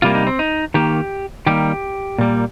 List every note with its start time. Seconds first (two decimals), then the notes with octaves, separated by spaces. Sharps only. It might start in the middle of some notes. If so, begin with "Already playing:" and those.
0.02 C3 G3 A#3 F4
0.15 D#4
0.27 C4
0.39 D#4
0.74 D#3 A#3 G4
1.46 D#3 G3 A#3 G4
2.18 A#2 G3 A#3